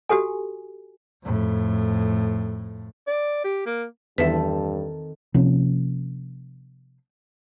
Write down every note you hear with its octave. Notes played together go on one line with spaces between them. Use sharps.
F#4 G4 A4 G#5
F2 A2
D5
G4
A#3
E2 G2 D#3 C4 A4 B4 E5
C3 F3 A#3 C#4